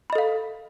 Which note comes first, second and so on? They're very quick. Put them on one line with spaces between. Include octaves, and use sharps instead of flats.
B5 D#5 A4 F5